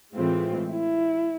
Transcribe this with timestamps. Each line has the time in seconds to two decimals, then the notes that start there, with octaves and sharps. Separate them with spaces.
0.15 A2 E3 G#3 C4 F4
0.72 E4